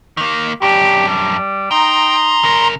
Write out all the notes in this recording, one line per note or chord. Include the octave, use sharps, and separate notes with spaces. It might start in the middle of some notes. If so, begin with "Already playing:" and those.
D#3 A#3
F#2 D4 G4
G3
D#4 G5 A#5 C6
C#3 A#4